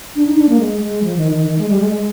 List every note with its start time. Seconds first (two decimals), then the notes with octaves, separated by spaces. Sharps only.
0.16 D4
0.27 D#4
0.38 D4
0.49 A#3
0.60 G#3
0.81 G#3
1.03 F3
1.18 D#3
1.32 D#3
1.46 D#3
1.59 G#3
1.69 G3
1.80 G#3
1.91 G#3